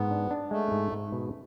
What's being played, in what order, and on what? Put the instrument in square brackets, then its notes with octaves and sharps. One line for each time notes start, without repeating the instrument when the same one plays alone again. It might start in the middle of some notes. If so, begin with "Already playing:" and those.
Already playing: [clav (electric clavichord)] G#2 [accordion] B3
[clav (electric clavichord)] D4
D4
[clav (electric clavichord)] G#3 [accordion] A3
[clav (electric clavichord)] G#2
G#2
B2